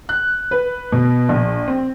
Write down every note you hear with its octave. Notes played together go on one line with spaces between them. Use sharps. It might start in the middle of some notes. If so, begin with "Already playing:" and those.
F#6
B4
B2
A#1
C4